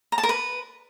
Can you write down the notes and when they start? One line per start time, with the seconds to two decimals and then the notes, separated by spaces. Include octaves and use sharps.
0.12 A#5
0.18 A5
0.23 A#4
0.29 B4